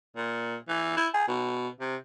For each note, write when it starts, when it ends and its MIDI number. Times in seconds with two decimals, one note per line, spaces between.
0.16 0.56 46
0.69 0.93 52
0.97 1.08 64
1.14 1.24 68
1.28 1.69 47
1.81 1.96 48